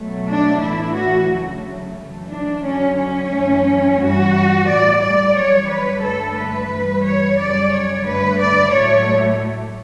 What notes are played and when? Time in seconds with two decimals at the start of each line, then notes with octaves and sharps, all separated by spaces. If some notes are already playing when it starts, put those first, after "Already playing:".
Already playing: B2 F#3 A3
0.27 D4
0.61 A2 E3 A3 E4
0.94 F#4
1.29 D2 C#3 F#3 A3
1.96 F#2 E3 A3
2.30 D4
2.63 F#2 D3 F#3 C#4
2.98 C#4
3.31 F#2 E3 A3
3.98 G2 E3 G3 F#4
4.66 A2 G3 D5
5.01 D5
5.34 F#2 E3 G3 C#5
5.68 B4
6.01 G2 D3 A3 A4
6.35 B4
6.70 G2 E3 G3
7.03 C#5
7.37 F#2 C#3 G3 D5
7.71 C#5
8.05 G2 D3 A3 B4
8.39 D5
8.72 A2 F#3 A3 C#5